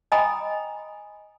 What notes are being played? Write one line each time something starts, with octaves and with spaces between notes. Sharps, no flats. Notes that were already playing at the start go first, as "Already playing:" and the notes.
D#5 G5 G#5 A#5 B5 D#6